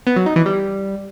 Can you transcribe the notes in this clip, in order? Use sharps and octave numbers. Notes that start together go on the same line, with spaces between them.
B3
F#3
D#4
E3
G3